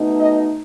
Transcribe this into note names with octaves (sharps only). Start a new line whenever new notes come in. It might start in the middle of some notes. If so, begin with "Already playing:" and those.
Already playing: B2 A3 D#4
D#5